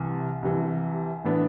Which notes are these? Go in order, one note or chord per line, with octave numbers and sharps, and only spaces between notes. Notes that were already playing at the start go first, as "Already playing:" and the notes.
Already playing: C2 C3 E3
C2 C3 E3
A2 E3 B3 D4